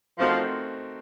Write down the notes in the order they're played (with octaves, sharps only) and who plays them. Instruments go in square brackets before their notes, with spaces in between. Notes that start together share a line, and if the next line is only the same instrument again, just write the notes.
[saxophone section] F3 [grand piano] A3 C4 D#4 F#4 A#4